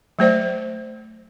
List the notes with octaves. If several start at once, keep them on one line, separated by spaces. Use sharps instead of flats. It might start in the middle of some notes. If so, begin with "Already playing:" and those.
F#3 A3 C5 D5